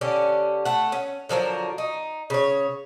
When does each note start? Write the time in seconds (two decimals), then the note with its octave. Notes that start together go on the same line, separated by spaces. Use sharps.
0.01 D3 C#4 G4
0.65 A3 F#5
0.92 C#4
1.29 D3 F3 F#3 A#4
1.78 D#4
2.30 C#3 C#5